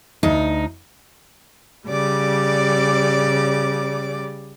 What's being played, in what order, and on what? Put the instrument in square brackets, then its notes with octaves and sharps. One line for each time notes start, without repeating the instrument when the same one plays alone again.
[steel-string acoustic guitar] D2 D#4
[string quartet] C#3 G3 D5 D6